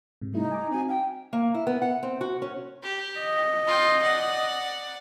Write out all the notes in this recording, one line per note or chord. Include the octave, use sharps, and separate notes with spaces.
G#2 C3
G3 A3 D#4 E4
G#5 D6
C4 F#4 G#5
F5 G5
A#3
E4
B3
F#5
C4
F#4
C#4
G4
D#5
F4 G5
D5 F#5